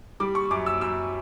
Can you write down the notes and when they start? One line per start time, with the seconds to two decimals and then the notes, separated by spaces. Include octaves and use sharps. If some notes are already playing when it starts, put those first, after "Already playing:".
0.20 G3 D6
0.35 C#6
0.51 F#2 D6
0.66 E6
0.81 F#2 E6